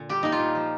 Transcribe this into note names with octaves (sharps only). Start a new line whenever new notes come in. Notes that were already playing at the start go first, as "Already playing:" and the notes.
Already playing: A#2 D3
G3 G4
A#3 D#4
F4
A#2
F3